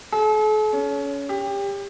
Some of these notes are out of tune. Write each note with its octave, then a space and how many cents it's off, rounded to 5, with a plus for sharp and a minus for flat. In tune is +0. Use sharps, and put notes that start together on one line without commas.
A4 -45
C#4 +20
G4 +25